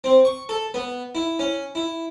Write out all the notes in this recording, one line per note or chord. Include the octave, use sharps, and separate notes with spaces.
C4
C#6
A4
B3
E4
C#4
E4